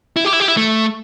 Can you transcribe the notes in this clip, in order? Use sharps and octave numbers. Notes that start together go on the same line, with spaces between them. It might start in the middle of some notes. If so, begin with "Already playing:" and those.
E4
G4
E4
G4
E4
A3